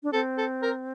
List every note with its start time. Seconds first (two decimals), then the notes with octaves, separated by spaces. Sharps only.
0.03 D4
0.13 C4 A4
0.38 A4
0.63 A#4